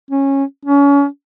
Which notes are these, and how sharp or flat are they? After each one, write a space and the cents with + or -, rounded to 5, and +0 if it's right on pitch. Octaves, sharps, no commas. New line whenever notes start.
C#4 -15
C#4 +30